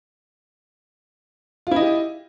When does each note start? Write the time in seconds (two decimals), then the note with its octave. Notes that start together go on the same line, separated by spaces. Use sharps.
1.67 F4
1.71 E4
1.76 D#5
1.81 G4